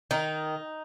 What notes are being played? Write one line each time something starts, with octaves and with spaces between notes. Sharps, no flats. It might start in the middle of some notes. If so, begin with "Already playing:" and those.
D#3 D#4